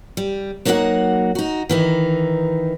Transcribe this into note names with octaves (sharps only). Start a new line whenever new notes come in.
G3
F#3 A#3 D#4 E4 F#4 F#5
D#4 F#4
D#3 E3 D#4